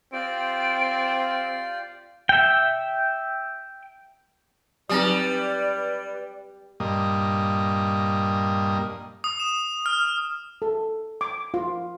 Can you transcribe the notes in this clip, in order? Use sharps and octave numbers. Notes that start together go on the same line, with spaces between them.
C4 F4 G4 D5 D7
E5 G5
F#3 G3 C4 D#4 B4 D5
G2 A#2 G3 A#3 D#5 D#6
D#6
E7
F6
A4
D6
F4